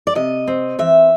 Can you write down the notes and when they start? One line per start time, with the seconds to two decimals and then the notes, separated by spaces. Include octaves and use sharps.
0.07 D5
0.15 C3 D#5
0.47 C4
0.79 E3 E5